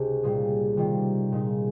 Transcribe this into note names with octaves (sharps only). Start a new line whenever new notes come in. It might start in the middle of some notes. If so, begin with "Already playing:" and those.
Already playing: C#2 C3 C#4 D#4 G4
A#2 G3 A#3 F4 G#4
C3 D#3 G3 C4 F4
A#2 G#3 D#4